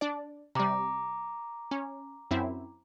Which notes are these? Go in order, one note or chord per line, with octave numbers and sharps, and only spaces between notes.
D4 D5
C3 G3 A#5 D6
C#4
F#2 C4 E4